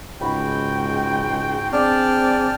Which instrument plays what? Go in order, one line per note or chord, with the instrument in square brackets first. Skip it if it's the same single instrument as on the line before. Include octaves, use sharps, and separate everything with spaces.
[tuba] C#2 [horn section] G#2 G5 [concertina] F#4 [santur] B5
[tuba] C4 [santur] D4 [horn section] G#4 D5 [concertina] G5 A5 F6